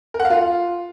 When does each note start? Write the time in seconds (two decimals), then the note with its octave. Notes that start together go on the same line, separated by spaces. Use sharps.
0.14 A#4
0.20 F#5
0.25 F5
0.30 F4